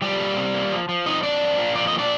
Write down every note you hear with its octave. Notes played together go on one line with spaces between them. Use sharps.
F3 G3 G4
A#3
C3
A#3
F3
F3
F2 D#4 D#5
F2 D4 D5
F3
A#3
F3 D5
D#5
A#3
D4 D5